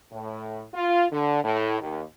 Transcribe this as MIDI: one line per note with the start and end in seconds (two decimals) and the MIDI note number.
0.12 0.63 45
0.74 1.05 65
1.12 1.39 50
1.43 1.79 45
1.81 2.02 39